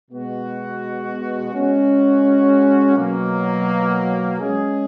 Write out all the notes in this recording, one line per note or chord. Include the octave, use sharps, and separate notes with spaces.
B2 G#3 B3 F#4
G#3 C#4 F#4
B2 F#3 A#3
G#3 C#4 G#4